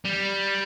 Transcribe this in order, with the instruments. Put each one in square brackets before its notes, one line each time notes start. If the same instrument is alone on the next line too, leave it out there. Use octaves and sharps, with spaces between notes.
[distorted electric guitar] G3